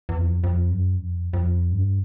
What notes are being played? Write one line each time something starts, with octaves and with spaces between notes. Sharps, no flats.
E2
F2
F2
F#2
F2
F2
G2